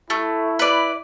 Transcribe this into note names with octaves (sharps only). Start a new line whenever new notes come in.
A3 E4
B4 D5